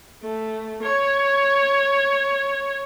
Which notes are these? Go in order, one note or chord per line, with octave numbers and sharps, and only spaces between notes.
A3
C#5